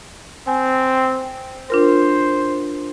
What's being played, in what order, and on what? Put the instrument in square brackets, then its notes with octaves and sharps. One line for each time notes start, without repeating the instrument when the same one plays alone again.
[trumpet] C4 [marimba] G#5
[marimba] D4 F4 A#4 [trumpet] C5